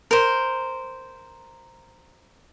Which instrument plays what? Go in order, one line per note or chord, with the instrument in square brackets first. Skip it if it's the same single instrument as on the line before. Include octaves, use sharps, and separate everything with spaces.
[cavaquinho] A#4 C5